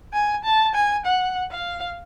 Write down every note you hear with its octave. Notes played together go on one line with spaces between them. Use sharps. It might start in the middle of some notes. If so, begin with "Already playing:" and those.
G#5
A5
G#5
F#5
F5